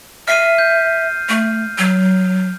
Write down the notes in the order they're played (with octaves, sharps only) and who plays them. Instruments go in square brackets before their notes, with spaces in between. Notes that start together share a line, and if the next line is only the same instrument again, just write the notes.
[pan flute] E5 [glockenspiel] F6 C7 D#7
[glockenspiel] G6
[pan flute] A3
F#3